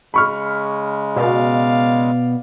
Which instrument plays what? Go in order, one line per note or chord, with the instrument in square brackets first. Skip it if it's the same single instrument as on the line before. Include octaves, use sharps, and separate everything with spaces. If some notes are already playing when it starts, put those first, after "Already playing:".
[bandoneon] C#3 G#3 [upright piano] B5 C#6 F6
[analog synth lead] B2 [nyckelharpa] D5 F5